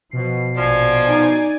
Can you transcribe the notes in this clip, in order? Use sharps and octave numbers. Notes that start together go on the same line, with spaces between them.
B2 F3 C7
A#1 F3 D5 G#5
D#4